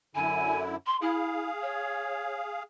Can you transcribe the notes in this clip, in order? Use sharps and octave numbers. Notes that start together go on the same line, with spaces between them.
F#2 D3 E4 G#5
C6
E4 G#4 F5
C#5